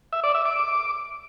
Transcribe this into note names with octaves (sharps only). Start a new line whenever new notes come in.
E5
D5
E5
D6